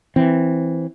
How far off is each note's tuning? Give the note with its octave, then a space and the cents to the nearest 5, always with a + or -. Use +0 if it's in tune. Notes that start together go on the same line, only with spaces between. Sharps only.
E3 +0 C4 +0